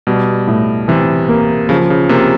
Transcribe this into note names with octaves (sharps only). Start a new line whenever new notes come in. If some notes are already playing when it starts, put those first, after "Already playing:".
B2 G3
A2
C3 E3
A#3
C#3 F3
C#3
C3 A#3